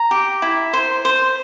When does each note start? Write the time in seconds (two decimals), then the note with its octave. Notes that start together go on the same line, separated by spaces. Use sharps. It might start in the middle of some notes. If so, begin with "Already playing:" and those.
Already playing: A#5
0.11 G4
0.42 E4
0.73 C5
1.05 C5